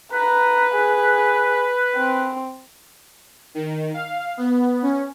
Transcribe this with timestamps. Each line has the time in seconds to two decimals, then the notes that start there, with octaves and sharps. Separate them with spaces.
0.12 B4 A#5
0.75 G#4
1.97 C4
3.55 D#3
3.94 F5
4.37 B3
4.83 C#4